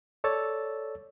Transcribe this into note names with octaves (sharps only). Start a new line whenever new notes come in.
A4 C#5 D5 E6 A6